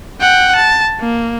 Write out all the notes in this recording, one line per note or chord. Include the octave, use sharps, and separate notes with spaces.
F#5 G5
A5
A#3